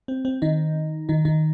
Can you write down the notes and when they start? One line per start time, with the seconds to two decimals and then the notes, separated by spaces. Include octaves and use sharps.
0.08 C4
0.25 C4
0.42 D#3 D#4
1.09 D#3 D#4
1.25 D#3 D#4